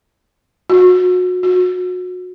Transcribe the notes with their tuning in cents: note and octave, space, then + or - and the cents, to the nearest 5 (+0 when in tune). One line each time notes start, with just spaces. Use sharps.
F#4 -30
F#4 -30